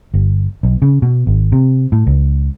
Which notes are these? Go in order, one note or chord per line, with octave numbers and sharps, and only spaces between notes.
G1
B1
C#3
B2
G#1
C3
A2
C#2